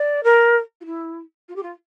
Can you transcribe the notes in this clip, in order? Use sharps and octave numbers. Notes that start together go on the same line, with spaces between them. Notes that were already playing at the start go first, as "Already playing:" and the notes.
Already playing: D5
A#4
F4
E4
F4
G4
F4